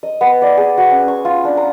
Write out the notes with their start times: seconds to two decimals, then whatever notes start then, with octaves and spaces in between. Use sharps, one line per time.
0.03 D#5
0.21 B3
0.42 D5
0.57 G#4
0.77 F#4
0.91 C#4
1.08 C#6
1.25 F4
1.45 D4
1.57 A#5